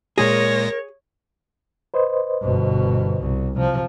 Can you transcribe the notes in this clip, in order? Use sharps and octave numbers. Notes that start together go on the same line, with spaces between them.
A#2 G#3 G#4 A#4 C#5 A#6
B4 C5 D#5
G1 B2
C2
C2 C3 F3